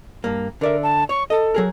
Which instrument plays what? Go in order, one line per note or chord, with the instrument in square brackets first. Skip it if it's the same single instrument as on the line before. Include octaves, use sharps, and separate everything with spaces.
[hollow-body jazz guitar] G2 A#3
[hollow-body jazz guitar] D3 D5 E5 [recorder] A#4
[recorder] A5
[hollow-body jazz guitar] C#5 [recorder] C#6
[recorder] A4 [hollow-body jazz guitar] D#5
[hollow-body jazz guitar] F#3 G#4 A#4